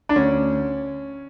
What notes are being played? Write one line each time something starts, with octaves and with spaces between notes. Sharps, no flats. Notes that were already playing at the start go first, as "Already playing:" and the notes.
D4
D2 C#4